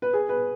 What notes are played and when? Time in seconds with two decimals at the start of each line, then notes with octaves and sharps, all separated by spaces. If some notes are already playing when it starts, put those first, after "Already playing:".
0.02 B4
0.13 G#4
0.29 B4